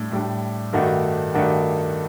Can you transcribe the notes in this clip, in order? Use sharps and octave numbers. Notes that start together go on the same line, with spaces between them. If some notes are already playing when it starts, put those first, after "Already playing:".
Already playing: A2 G3 D4
A2 G3 D4
G2 D#3 A3 D4 F#4
G2 D#3 A3 D4 F#4